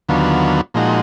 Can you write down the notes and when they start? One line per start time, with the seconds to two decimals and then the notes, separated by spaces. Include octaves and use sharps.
0.09 D#2 D3 F#3 B3 F4
0.74 A#2 F3 G#3 D#4 F#4